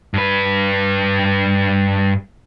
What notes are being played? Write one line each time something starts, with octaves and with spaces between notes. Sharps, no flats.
G2 B4